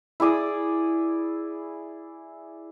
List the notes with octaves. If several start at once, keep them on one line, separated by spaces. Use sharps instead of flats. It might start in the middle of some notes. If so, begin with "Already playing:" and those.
E4 G#4 D5 D#6